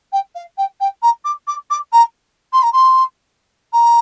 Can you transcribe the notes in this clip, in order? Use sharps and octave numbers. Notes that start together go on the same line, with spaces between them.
G5
F5
G5
G5
A#5
D6
D6
D6
A#5
C6
A#5
C6
A#5